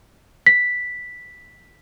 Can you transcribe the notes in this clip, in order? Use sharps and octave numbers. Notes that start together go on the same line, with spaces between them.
B6